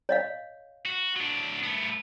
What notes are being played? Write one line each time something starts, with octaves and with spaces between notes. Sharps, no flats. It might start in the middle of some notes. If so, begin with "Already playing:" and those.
C#5 D#5 F5
F#4
F#3 D4
A3 B3